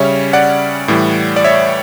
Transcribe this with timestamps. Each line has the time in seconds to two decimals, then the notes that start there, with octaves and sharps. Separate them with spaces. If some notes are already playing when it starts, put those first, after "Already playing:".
Already playing: C#3 G3 C#4 C#5 E5
0.33 D5 F#5
0.88 A2 E3 G3
1.36 D5
1.44 C#5 E5